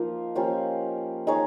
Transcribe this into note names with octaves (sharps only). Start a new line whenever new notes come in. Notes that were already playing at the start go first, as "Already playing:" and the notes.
Already playing: F3 A#3 D#4
F3 A#3 C#4 G4
D#4 G#4 C#5